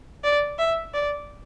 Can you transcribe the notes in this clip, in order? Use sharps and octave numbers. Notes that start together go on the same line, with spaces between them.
D5
E5
D5